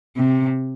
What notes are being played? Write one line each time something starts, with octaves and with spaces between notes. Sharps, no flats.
C3